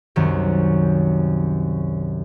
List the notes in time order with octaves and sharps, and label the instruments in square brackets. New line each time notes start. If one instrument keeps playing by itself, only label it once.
[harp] C2 F#2 D#3